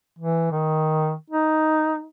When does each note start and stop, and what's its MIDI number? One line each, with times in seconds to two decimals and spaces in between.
0.19 0.47 52
0.51 1.13 51
1.30 2.05 63